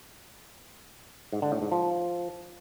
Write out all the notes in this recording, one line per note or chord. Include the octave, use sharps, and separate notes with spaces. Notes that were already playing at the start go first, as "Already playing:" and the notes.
G#2
D3
A2
G#2
F3